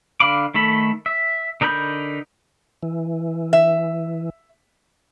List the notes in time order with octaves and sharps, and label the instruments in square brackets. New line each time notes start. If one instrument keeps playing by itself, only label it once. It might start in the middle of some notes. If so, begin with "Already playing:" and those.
[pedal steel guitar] D3 F5 B5 D6
D#3 A3 A4 B5
E5
D3 D#4 A#4 B5 G6
[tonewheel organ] E3
[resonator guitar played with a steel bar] E5